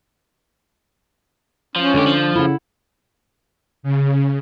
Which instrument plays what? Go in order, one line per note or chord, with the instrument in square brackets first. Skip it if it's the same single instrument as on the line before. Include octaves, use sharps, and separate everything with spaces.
[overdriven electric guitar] F3 [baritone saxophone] C#4
[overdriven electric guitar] C#2 G4 [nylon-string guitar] D3
[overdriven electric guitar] F3
[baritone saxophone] C#3 [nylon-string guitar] E4 F#5
[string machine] C#3